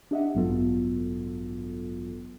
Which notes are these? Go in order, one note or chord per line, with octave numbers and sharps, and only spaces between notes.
D4 G4 D#5 E5 F#5
A1 G2 F#3 B3 F4 A4